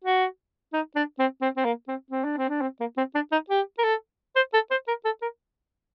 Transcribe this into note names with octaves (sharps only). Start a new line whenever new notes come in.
F#4
D#4
D4
C4
C4
C4
A#3
C4
C4
D4
C4
D4
C4
A#3
C4
D4
D#4
G4
A#4
A4
C5
A4
C5
A#4
A4
A#4